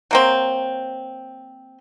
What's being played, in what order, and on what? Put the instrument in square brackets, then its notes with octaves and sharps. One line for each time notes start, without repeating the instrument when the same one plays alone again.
[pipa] F#3 A#3 C4